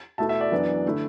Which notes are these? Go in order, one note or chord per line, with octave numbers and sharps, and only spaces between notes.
B2 A3 E4 E5 A5
E5
D5
F#2 E3 B3 D4
D3 A3 E4